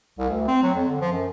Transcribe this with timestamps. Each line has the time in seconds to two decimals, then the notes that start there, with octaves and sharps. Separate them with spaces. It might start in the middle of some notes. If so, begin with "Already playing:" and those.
0.19 C2
0.30 D2
0.48 C4
0.63 F#3
0.74 F2
0.88 D3
1.01 F3
1.12 F#2